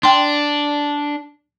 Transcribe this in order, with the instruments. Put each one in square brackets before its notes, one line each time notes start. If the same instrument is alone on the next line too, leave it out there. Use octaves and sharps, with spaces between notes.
[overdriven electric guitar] D4 [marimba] G5 C6